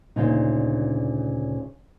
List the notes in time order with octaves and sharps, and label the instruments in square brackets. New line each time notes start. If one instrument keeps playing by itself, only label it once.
[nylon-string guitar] D2 A#2 C#3 D#4